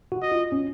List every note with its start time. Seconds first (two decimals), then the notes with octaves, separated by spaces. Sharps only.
0.12 F#4
0.22 D#5
0.32 F4
0.52 C#4